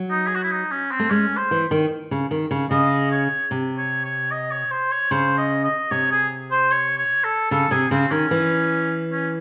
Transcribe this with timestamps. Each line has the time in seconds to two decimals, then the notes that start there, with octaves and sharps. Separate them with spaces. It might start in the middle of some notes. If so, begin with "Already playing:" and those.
Already playing: F#3
0.10 D#4
0.27 G#4
0.35 F#4
0.43 E4
0.51 D#4
0.71 C#4
0.91 C4
0.99 A3
1.11 G#3 C#4
1.37 C5
1.51 E3
1.71 D#3
2.11 C#3
2.31 D#3
2.51 C#3
2.71 C#3 D#5
3.11 C#5
3.51 C3
3.78 C#5
4.04 C#5
4.31 D#5
4.51 C#5
4.71 C5
4.91 C#5
5.11 C#3 C5
5.37 D#5
5.64 D#5
5.91 C3 C#5
6.11 G#4
6.51 C5
6.71 C#5
6.98 C#5
7.24 A4
7.51 C#3 A4
7.71 C3 G#4
7.91 C#3 C4
8.11 D#3 C#4
8.31 E3
9.11 C#4